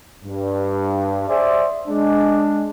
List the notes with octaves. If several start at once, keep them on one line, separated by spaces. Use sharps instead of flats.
G2
G#4 C5 D5 E5
G#3 D4